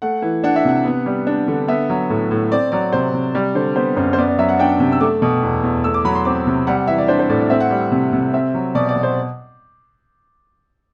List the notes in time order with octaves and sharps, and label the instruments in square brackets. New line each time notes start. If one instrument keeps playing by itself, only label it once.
[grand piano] A3 F#5
E3
D4 F#5
E5
C3 F#5
B3
G3
D4
D3
B3 E5
F#3
A2
A2
C4 D5
F#3 D5
C3 C5
C3
G3 D5
D3 C5
B3 C5
F#2 C5
C5
B3 D5
D5
F#3 E5
F#5
D4 G5
C3
E6
A3 D6
B2
E2
E2
A3 E6
D6
F#3 B5
C6
C4 D6
C3
G3 F#5
F#5
E3 E5
D5
D4 C5
C5
A2 D5
D5
C4 E5
F#5
G3
C3
C3
C4 E5
F#3
B2 D5
D5
B2
C5